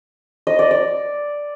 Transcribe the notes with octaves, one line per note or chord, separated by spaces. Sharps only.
D#5
D5
D5